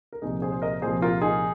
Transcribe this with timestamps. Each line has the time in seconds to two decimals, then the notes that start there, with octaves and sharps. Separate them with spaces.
0.13 A#4
0.22 C2 A#2 F3 D#4 G#4
0.42 G#4 C5
0.52 C5
0.62 A#4 D#5
0.82 C2 A#2 F3 G#4 C5
1.02 F4 A#4
1.22 D#4 G#4